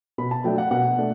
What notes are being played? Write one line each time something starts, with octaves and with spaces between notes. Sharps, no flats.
B2 B5
A5
F#3 A3 D4 G5
F#5
B2 F#5
A3 D4